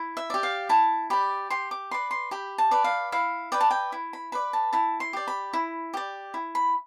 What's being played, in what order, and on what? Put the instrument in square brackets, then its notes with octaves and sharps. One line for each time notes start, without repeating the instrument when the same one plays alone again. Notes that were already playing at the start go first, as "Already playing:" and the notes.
Already playing: [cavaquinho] E4
E5
G4 D5
F5
E4 A5
G4 D5 B5
G4 C6
D6
B4 D5 C6
C6
G4 B5
A5
B4 D5
F5
E4 F5
B4 D5 G5
A5
G5
E4
B5
B4 D5 B5
A5
E4 A5
C6
G4 D5
B5
E4
G4 D5
E4
B5